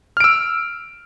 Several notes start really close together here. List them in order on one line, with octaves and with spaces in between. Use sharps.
F6 D7 E6